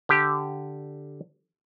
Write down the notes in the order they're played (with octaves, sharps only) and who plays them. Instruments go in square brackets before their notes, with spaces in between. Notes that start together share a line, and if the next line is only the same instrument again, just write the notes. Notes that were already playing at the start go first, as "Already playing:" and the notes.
[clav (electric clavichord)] D3 G4